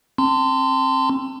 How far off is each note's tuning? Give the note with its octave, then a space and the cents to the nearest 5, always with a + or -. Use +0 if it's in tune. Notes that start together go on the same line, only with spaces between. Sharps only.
C4 +25 A5 +30 C6 -20